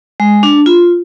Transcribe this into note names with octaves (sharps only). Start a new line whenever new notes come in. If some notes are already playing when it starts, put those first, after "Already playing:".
G#3
D4
F4